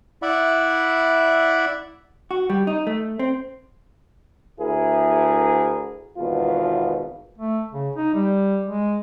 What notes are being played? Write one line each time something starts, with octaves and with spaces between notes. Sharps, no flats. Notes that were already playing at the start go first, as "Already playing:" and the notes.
E4 D5 E5 F#5 B5
F#4
G3
D#4
A3
C4
D2 E4 G#4 A#4
G#1 E2 B2 F4
A3
C#3
D#4
G3
G#3